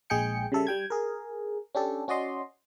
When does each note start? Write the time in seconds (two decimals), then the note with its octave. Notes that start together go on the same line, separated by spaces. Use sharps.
0.10 A#1 G#3 G#4 G5 C#7
0.52 C#3 G3 A4 E5
0.67 G3 G5 G#6
0.90 G#4 A#4
1.75 C#4 D4 G4 A4
2.08 C#4 F#4 D5 D#5 C6